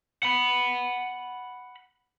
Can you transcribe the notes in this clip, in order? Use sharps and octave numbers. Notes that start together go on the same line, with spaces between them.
F#5 B5